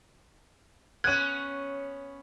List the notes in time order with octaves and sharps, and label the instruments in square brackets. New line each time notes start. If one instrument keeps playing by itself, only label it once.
[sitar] B3 C#4 [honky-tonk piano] F#6 D#7 [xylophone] G#6